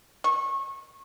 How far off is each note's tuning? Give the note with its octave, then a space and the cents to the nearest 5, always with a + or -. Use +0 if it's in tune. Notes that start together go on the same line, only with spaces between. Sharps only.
C#6 -25